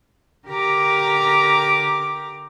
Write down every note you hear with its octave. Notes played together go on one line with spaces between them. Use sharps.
D3 G4 A#4 A#5 D6